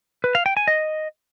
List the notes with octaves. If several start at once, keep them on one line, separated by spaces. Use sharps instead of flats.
B4
F5
G5
G#5
D#5